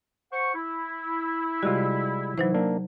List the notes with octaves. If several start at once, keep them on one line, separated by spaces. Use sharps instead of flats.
C5 F#5 C#6
E4
C3 G3 G#3 F4 F#4
E3 F#3 D#4 C5
A#3 D4